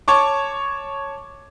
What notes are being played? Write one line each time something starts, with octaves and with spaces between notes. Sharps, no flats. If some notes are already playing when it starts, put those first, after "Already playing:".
C#5 A5 C#6 D6